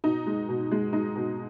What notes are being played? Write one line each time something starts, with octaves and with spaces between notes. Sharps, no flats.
B2 D#4
G#3
B2
G#3
G#3 D#4
B2